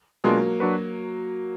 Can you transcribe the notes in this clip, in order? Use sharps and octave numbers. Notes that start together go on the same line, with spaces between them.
B2 F#3 G#3 A#3 D4 F4
F#3 D4 F#4 B4